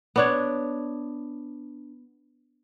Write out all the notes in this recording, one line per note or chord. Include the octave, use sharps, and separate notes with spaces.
B3 D4 C#5